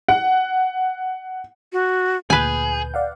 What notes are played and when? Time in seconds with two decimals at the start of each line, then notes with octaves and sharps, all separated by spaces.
0.09 F#5
1.73 F#4
2.30 D2 A#2 G#4 B4 G#5 G6
2.94 D5 F5 F#5